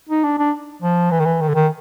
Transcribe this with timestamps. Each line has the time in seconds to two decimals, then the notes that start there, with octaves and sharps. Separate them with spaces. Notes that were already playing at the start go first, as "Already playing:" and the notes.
0.09 D#4
0.24 D4
0.38 D4
0.82 F3
1.11 E3
1.20 D#3
1.26 E3
1.41 D#3
1.48 D3
1.55 D#3